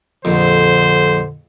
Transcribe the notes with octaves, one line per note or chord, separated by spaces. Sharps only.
A#1 F2 D3 C5